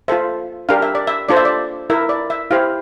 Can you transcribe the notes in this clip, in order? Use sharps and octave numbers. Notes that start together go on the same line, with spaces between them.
F4 A4 C5 E5
D4 G4 A#4 F5
E5
D5
E5
D4 F4 A4 C5 D5
E5
D5
E4 A#4 E5
D5
E5
E4 G4 C5 F5